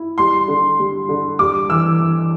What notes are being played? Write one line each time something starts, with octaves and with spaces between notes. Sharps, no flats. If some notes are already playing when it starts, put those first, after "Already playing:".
Already playing: E4
G3 C6
D3
G3
D3
G3 D6
E3 E6
E3